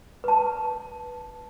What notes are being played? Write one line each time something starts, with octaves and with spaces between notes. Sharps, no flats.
B4 A5